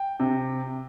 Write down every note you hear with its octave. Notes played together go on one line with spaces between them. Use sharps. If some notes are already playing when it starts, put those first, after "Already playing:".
Already playing: G5
C3